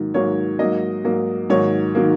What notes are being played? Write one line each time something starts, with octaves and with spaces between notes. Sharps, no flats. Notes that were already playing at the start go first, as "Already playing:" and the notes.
Already playing: G#2 D#3 F#3 A#3
G#2 D#3 F#3 A#3 C#5
G#2 F#3 A#3 D#5
G#2 F#3 A#3
G#2 D#3 F#3 A#3 C#5
D#3 F#3 A#3